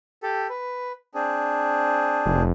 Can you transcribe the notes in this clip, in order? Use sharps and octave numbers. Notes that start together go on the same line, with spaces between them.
G4 A4
B4
C4 D4 G#4
F1